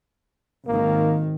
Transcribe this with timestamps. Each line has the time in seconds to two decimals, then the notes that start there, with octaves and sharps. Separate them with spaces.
0.67 G#1 D#3 A#3